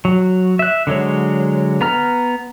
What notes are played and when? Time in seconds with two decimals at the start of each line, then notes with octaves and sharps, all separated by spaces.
0.05 F#3
0.59 E5 F#6
0.87 D3 F#3 G#3 C#5
1.81 B3 A#5 F6